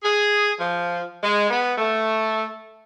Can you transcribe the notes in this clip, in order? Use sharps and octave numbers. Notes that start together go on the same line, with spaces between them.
G#4
F3
G#3
B3
A3